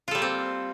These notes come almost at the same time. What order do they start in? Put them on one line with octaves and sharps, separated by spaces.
F4 A4 G3 A#3 C4